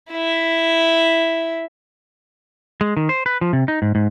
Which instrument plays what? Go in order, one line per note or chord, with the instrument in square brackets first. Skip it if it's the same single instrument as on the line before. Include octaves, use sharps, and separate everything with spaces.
[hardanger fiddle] E4 E5
[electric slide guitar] G#3
D#3
C5
B4
F3
C3
D#4
G#2
G#2